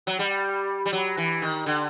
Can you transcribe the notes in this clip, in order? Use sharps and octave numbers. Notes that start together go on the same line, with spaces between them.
F#3
G3
G3
F#3
E3
D#3
D3